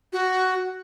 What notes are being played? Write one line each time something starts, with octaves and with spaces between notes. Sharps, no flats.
F#4